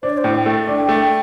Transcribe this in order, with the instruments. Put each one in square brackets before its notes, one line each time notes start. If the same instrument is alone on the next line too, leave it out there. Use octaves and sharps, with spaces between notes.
[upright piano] D4 [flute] C5
[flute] D5
C5
[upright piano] A2
[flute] G5
[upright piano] A3
D4
A3